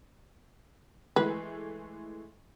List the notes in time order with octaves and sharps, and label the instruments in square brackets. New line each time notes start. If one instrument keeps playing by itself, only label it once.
[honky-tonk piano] E3 G#3 A3 [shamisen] B4